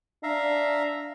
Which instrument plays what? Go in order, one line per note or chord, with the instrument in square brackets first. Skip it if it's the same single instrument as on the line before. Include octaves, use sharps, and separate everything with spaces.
[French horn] D4 [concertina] E5 F5 A#5